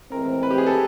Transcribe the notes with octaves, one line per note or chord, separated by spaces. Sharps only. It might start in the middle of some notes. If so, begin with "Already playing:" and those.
A2 E3 G#3 C4 A#4
B4
G4
G#4
A4